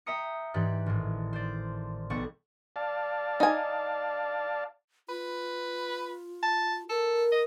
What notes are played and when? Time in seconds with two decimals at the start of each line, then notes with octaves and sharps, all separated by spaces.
0.06 E5 G5 A#5 D#6 C#7
0.54 G#2 E3 G4 D5 F#6
0.86 G#1 A2
1.33 C5 D5
2.10 B1 G3 B3 A4 F#5 C#6
2.76 D5 F5 A5
3.40 D#4 G#5
5.09 F4 B4
6.43 A5
6.89 A4 A#4
7.32 D#5